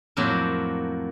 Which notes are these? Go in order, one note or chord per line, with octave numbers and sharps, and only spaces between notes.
F2 A2 F#3 A#3 C5